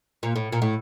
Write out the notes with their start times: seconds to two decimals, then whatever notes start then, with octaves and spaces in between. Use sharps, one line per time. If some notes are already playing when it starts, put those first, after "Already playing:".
0.23 A#2
0.36 A2
0.52 A#2
0.62 A2